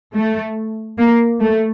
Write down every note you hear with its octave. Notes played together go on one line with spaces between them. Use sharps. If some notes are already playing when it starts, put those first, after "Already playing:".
A3
A#3
A3